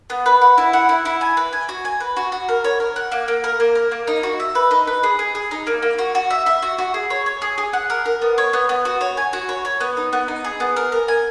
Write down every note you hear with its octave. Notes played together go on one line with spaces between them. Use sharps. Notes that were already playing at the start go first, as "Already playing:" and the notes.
B3
B4
F#5
E4
F#5
E4
E4
G#5
B4
G#5
F#4
G#5
B4
F#4
F#4
A#4
C#5
A#4
F#5
A#3
A#3
A#4
A#3
A#4
A#3
D#4
F#4
E5
B4
D#4
B4
G#4
G#4
G#4
D#4
A#3
A#3
F#4
F#4
E5
E5
F#4
F#4
G#4
C#5
C#5
G#4
G#4
F#5
A#4
A#4
B3
C#5
B3
B3
F#4
C#5
G#5
F#4
C#5
C#5
B3
D#4
B3
D#4
G#4
B3
A#4
A#4
G#5